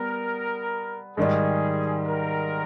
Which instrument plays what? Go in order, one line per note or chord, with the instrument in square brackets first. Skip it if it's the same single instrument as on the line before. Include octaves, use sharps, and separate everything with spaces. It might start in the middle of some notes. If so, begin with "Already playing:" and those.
Already playing: [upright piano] G3 B3 [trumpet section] A#4
[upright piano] G#2 D#3 G3 [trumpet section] G#4
[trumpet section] A#4